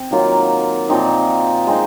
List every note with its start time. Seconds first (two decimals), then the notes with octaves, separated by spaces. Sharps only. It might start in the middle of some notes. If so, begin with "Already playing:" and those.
Already playing: C4
0.11 D#3 F#3 A#3 F4
0.89 A#2 F3 C4 D#4
1.67 G#3 C4 D#4